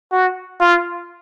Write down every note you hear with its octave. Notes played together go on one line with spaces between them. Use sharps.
F#4
F4